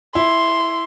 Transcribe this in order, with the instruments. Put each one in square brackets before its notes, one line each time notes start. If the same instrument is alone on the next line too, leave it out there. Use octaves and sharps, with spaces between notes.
[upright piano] E4 [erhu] C6